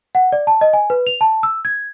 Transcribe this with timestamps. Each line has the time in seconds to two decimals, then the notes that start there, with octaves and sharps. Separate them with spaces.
0.15 F#5
0.32 D5
0.47 A5
0.61 D#5
0.73 G#5
0.90 B4
1.07 F7
1.21 A5
1.43 E6
1.65 G#6